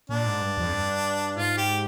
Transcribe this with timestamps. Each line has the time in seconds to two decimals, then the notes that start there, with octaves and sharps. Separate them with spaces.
0.09 A#2 D4
0.26 G#2
0.41 G2
0.58 F2
0.73 G2
1.36 G#2 F4
1.57 G4